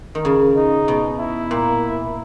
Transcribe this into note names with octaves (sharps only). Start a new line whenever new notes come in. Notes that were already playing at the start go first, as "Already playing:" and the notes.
D#3
C#3
D#4
B2
E4
A#2